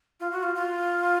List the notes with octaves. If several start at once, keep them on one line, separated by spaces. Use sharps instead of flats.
F4
F#4
F4
F4